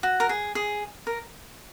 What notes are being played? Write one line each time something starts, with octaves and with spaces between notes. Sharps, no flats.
F#4
A#4
G#4
G#4
A#4